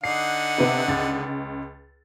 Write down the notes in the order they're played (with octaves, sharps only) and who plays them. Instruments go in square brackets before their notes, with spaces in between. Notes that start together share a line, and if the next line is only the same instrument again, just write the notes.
[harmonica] D3 D#4 F#5 [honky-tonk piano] C7
[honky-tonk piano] C3 B3
C#2 A6